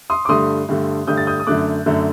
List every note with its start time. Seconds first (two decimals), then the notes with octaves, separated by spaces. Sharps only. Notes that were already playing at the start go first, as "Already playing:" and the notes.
0.10 C6 D#6
0.25 D6
0.29 G2 D3 A3 C6 D#6
0.69 G2 D3 A3
1.07 G2 D3 A3 D#6 G6
1.17 A6
1.27 D#6 G6
1.40 D#6
1.47 F#2 D3 A3 D6 F#6
1.86 F#2 D3 A3